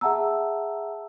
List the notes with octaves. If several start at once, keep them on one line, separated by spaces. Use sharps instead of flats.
G#4 E5 F#5 A5 A#5 E6